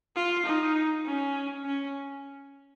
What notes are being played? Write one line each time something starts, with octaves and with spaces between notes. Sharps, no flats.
F4
D#4
C#4
C#4